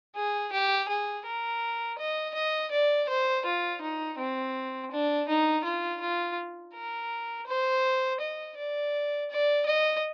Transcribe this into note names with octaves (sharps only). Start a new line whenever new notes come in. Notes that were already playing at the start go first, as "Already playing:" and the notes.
G#4
G4
G#4
A#4
D#5
D#5
D5
C5
F4
D#4
C4
D4
D#4
F4
F4
A#4
C5
D#5
D5
D5
D#5